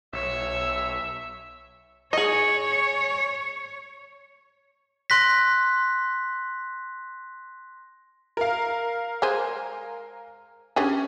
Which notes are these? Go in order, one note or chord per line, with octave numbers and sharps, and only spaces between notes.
B1 C#5 E5 E6
G#4 C#5 D#5
C6 F#6 A#6 B6
A#4 F5
G#3 G#4 C5
C#4 D4 G4 G#4